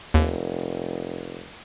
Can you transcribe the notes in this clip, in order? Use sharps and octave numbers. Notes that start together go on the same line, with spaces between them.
F1 D#2